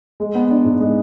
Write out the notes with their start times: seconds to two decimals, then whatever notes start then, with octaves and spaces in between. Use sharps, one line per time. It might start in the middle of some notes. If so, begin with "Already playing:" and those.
0.20 G#3
0.35 B3
0.50 D4
0.65 G#2
0.80 G#3